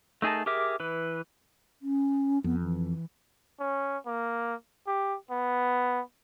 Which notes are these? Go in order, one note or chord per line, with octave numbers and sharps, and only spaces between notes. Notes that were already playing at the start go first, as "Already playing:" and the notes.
A3 D#4 G#4 A#4 A5
G4 G#4 A#4 E5 D6
E3 B4
C#4
F2 B3
E3
C#4
A#3
G4
B3